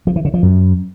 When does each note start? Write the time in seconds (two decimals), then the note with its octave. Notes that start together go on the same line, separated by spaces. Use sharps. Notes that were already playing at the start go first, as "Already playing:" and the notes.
0.07 F3
0.16 E3
0.25 C#3
0.34 F3
0.43 F#2